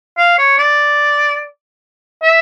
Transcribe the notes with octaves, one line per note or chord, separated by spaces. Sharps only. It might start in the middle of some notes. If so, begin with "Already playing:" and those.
F5
C#5
D5
E5